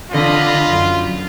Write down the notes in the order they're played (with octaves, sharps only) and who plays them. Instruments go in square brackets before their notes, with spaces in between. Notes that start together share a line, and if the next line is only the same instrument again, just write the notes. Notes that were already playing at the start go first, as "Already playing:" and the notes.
[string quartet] D3 D#5 B5 [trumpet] F4
[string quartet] F#2